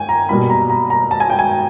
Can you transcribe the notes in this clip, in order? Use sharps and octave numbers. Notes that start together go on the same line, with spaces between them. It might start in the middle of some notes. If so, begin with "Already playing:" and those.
Already playing: G5 G#5
A#5
B2 G3 A#3 B5
A#5
A#5
A#5
A5
G#5
G5
G#5